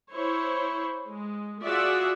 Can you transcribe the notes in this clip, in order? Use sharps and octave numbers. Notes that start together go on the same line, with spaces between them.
E4 C5 C#5
G#3
F4 F#4 G#4 D5 E5 F#5